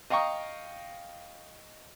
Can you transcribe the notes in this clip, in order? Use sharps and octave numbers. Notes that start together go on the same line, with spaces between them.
D#5 F5 G5 A#5 C#6 D#6